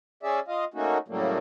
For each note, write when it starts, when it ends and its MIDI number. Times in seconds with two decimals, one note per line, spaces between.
0.23 0.40 61
0.23 0.40 68
0.23 0.40 74
0.23 0.40 76
0.48 0.65 65
0.48 0.65 75
0.48 0.65 77
0.74 0.98 57
0.74 0.98 58
0.74 0.98 61
0.74 0.98 63
0.74 0.98 66
1.08 1.38 45
1.08 1.38 49
1.08 1.38 54
1.08 1.38 55
1.08 1.38 57
1.08 1.38 58